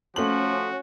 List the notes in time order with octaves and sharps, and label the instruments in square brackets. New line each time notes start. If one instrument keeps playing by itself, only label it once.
[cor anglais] F3 [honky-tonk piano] A3 F#7 [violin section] C#4 [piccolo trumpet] F#4